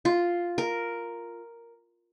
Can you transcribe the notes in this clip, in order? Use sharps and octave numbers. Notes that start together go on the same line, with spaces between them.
F4
A#4